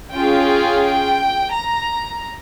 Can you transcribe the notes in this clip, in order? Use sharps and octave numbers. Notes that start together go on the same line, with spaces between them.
C#4 F4 G#4 G5
G5
A#5